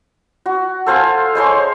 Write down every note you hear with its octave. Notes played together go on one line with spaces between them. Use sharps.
F#4
A4 C5 F5 G#5
G#3 C5 C#5 C6